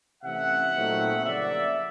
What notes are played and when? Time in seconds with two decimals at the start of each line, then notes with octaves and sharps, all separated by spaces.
0.23 C3 E3 A3 C#4 E5 F#5
0.74 A#2 F#3 A3 C4 D#4
1.25 C#3 F3 A#3 D5 E5